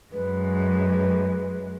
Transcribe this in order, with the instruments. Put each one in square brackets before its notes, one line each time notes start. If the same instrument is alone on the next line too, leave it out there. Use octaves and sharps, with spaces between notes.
[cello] F#2 G#3 [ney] B4